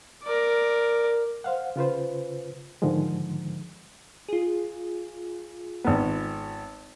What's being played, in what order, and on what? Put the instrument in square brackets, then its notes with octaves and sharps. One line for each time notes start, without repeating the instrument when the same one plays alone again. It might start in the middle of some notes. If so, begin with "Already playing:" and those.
[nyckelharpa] A#4 D5
[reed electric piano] C5 F5 F#5
C#3 F4 B4 C5
G#2 D3 D#3 F3 G#3
[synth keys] F4 G#4
[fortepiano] G#1 B3